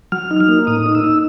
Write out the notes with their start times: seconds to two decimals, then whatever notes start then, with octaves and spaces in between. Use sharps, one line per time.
0.12 F#3 F6
0.31 D#4
0.40 F6
0.49 A#3
0.67 A2 D#6
0.86 D#4
0.95 E6
1.04 D#4